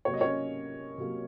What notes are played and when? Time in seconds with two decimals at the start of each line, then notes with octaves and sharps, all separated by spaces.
0.05 C3 F#3 A#3 C#5
0.14 D#5
0.21 C#4 C#5
0.98 C3 F#3 A#3